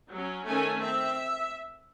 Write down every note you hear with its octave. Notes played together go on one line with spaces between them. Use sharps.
F#3 C#4
D#3 A3 C#4 G#5
C4 E5